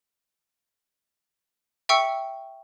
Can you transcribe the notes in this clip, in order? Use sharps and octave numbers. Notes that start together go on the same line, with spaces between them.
E5 G5 C#6 E6 C#7